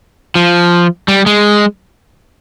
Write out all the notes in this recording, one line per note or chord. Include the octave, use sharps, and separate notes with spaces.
F3
G3
G#3